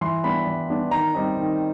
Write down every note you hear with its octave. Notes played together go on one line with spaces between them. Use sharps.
E3 C6
G3 B3 D4 B5
E3
G3 B3 D4
D#3 A#5
G3 C4 D#4
D#3